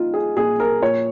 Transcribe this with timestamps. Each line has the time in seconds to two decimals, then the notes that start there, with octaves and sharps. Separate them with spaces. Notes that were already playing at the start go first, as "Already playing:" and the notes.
Already playing: A#3 D#4 F4
0.14 G#4
0.36 A#2 G#4
0.60 A#4
0.82 A#2 C#5